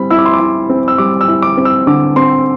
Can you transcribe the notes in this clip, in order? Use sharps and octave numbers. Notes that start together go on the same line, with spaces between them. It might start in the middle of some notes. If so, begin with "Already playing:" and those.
Already playing: G3 C4 E4 B5
E4 E6
D6
C6
D6
E4
C4
E6
G3 D6
E6
E4
D6
C4
E6
D3 D6
C4 C6